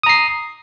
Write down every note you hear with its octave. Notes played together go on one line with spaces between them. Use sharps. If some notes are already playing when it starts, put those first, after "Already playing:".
A#5 D#6 C7